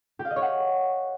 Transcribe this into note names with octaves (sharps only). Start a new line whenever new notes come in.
G4
F5
D#5
C#5
F#5